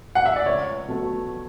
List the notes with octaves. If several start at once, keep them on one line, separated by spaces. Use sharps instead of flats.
F#5
E5
D5
C#2 C#5
B2 F#3 A3